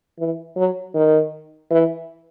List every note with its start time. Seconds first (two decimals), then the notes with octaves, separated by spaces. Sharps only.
0.19 E3
0.57 F#3
0.95 D#3
1.71 E3